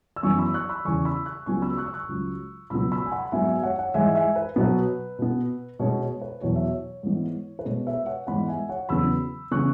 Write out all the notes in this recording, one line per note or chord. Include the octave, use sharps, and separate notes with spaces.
E6
F#2 E3 B3 G#5 C#6
B5 E6
C#6 F#6
B5 E6
E2 C#3 E3 G#5 C#6
B5 E6
C#6 F#6
C#2 C#3 F#3 B3 G#5 C#6
B5 E6
C#6 F#6
E6
C#6 F#6
C#2 C#3 F#3
C#2 B2 F#3 B3 B5 E6
B5 E6
G#5
F#5 B5
B5
G#2 F#3 B3 E5 G#5
E5 G#5
C#5 F#5
C#5 F#5
G#2 E3 G#3 E5 G#5
E5 G#5
B4
B2 F#3 B3 B4
B2 B3
B2 G#3 B3 C#5
C#5
B4
E2 B2 F#3 C#5
E5
C#5
G#2 E3 B3
B4
B2 G#3 B3 C#5
B4 E5
C#5 F#5
G#2 E3 B3 F#5 B5
E5 G#5
C#5 F#5
E2 C#3 F#3 B3 B5 E6
C#3 E3 B3 C#6 F#6